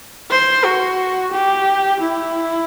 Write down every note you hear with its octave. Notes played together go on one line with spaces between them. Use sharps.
C5
F#4
G4
E4